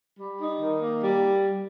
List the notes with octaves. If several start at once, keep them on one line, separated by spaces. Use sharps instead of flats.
G3
D#4
D#3
A#3
G3